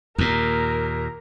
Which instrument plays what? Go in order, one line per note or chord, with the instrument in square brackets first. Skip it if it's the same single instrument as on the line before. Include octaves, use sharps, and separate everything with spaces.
[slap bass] D#2 A#2 [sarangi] A#4